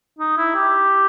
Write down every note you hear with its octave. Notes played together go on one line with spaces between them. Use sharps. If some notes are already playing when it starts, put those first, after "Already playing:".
D#4
E4
G4